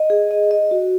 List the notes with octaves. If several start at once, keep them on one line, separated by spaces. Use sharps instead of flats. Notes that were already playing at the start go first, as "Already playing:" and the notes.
Already playing: D#5
G#4
D#5
D#5
F#4